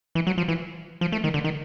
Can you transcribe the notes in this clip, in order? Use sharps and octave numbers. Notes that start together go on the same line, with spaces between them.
E3
F#3
F3
E3
F3
A3
D#3
D3
D#3